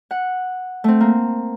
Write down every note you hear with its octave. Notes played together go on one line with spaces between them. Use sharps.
F#5
A3 C4
A#3